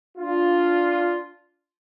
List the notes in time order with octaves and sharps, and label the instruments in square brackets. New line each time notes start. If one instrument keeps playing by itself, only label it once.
[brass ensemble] D4 F4